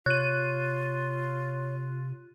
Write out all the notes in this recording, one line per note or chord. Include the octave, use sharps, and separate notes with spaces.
C3 F4 C#5 F#6 D#7